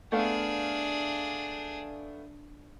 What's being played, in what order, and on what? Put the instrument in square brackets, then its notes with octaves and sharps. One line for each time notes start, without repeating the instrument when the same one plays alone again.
[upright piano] A3 B3 F5 [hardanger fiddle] D4 G#4